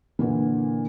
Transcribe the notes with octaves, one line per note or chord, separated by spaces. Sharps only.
A#2 D3 E3